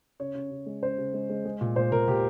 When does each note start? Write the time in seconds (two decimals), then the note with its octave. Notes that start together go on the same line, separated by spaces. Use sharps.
0.20 C#3 C#5
0.35 C#3
0.51 C#3
0.66 G#3
0.82 C#3 C5
0.98 C#3
1.14 G#3
1.30 G#3
1.45 G#3
1.61 A#2
1.76 A#2 C5
1.92 A#2 A#4
2.08 A#2 G4